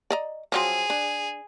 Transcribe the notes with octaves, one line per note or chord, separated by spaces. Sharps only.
D5 D#5 A#5
F3 F#3 C4 G#4
D4